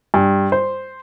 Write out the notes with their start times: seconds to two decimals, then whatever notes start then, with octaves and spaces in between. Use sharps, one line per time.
0.14 G2
0.52 C5